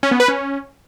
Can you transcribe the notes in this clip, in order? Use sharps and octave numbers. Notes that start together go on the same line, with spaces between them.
C#4
B3
B4
C#4